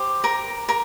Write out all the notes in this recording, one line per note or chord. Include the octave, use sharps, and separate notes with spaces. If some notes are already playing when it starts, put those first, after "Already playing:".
Already playing: G4 C5
A#4 A#5
A#4